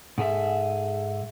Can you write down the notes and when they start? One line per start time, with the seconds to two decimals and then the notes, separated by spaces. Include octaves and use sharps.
0.18 G#2 G#4 A4 E5